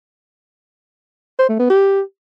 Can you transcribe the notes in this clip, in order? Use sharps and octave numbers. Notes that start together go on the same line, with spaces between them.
C5
A3
B3
G4